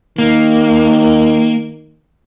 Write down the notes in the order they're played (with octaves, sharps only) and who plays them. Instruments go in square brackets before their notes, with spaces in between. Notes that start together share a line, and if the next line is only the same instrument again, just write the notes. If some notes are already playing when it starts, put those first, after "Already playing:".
[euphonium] D#3 [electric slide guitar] A#3